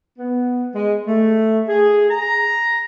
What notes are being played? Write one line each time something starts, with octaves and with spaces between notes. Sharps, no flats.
B3
G#3
A3
G#4
A#5